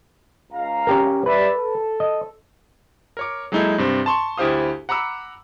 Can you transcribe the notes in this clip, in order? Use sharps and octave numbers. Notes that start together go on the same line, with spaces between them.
C#2 F5 A#5
C#4 G4 A#4
G3 B4 D5 E5
A4
D#5
A#4 C#5 D6
F#3 G#3 A#3 D#4 E4 A4
G2 C3 C4
A5 C6 C#6
D2 E4 G4 C5 F5 D#6
F#5 A#5 B5 D6 E6